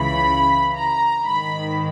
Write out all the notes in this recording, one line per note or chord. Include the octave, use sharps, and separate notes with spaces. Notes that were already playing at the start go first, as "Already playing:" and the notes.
Already playing: C#2 C#3 E3 B5
A#5
G#2 D#3 B5